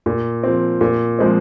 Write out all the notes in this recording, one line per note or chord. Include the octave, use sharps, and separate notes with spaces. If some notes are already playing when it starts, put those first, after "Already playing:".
A#2
F3 C4
A#2
F3 G#3 C4